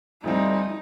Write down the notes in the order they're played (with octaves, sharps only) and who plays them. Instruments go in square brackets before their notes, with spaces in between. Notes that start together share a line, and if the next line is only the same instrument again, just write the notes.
[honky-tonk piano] D2 F3 C4 [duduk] G3 [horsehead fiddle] D#4